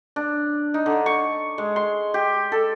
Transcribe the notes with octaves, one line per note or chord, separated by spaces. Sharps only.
D4
D#4
D3
C#6
G#3
C6
G4
A4